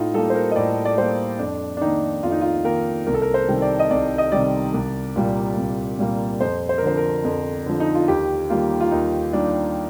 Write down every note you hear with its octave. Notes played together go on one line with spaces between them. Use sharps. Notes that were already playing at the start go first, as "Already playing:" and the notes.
Already playing: A2 D#4 F4
G3 A#3 A4
C5
A#4
D#5
A2 D5
D5
G3 A#3 C5
F2 D4
D4
D#3 A#3 D#4
F2 F4
D#4
F4
D#3 A#3 A#4
C2 A#4
A4
A#4
C5
C3 D#3 G3
D5
D#5
C2 D5
D#5
C3 D#3 G3 D5
C2
A#2 G3 A#3
C2
A#2 G3 A#3
F2 C5
C5
A#4
D3 F3 C5
A#4
F2
D3 F3
D#4
F4
D#2 G4
D#3 G3 A#3 F4
F4
D#2 D#4
D#3 G3 A#3 D4